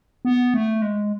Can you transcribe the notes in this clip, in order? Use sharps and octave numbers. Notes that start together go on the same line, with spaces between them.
B3
A3
G#3